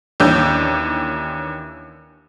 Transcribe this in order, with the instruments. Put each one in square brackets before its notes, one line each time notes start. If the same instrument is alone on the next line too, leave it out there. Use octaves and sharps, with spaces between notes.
[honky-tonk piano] D#2 E3 C#4 D4 G6